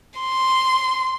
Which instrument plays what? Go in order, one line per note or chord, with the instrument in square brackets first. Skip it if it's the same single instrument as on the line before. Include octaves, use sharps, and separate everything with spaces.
[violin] C6